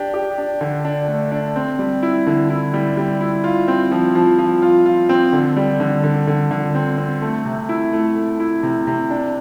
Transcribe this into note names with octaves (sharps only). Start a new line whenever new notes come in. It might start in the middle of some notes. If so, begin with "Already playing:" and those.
Already playing: D4 G4
G4
D4
D3
D4
A3
D4
C4
G3
E4
D3
E4
G3
G3
E4
F4
C4
F3
F3
F3
F4
F4
C4
D3
G3
D3
D3
D3
D3
C4
C4
A3
C3
E4
A3
A3
E4
C3
C3
D4